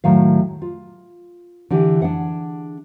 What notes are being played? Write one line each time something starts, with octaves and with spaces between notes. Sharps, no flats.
A2 D#3 F#3 F5
F4
D3 E3 D4 G4
D4 G#4 F#5